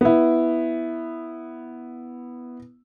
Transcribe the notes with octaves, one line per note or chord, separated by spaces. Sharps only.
B3 E4